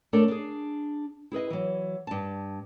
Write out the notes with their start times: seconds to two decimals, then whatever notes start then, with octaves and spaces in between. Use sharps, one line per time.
0.13 A3 D4 A4 A#4 C#5 D5
0.28 D4 G#4
1.32 E4 G#4 B4 D#5
1.50 E3 F#3
2.07 G2 A5